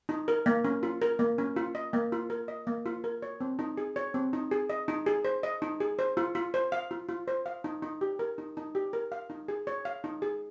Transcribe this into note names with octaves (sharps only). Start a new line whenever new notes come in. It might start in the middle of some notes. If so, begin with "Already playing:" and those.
D#4
A#4
A#3
C#4
F4
A#4
A#3
C#4
F4
D#5
A#3
F4
A#4
D#5
A#3
F4
A#4
C#5
C4
D#4
G#4
C#5
C4
D#4
G#4
D#5
D#4
G#4
C5
D#5
D#4
G#4
C5
F4
F4
C5
F5
F4
F4
C5
F5
D#4
D#4
G4
A#4
D#4
D#4
G4
A#4
F5
D#4
G#4
C#5
F5
D#4
G#4